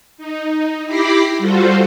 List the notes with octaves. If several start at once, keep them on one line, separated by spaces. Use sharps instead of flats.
D#4
E4 G4 B5 D6 A#6 C7
G3 F4 F#4 A4 C5